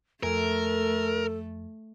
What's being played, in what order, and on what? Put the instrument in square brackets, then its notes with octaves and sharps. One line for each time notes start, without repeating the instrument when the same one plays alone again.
[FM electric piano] F2 F3 [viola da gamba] A3 [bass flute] A4 [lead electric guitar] A#4